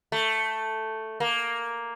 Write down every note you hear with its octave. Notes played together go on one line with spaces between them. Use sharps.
A3
A#3